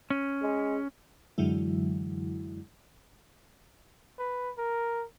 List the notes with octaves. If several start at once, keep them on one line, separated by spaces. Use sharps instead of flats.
C#4
G#3
F#2 D3 E3 F#3 G#3 E4
B4
A#4